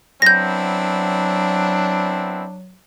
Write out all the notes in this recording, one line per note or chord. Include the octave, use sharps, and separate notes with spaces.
F#3 B3 C4 D4 E4 G6 A#6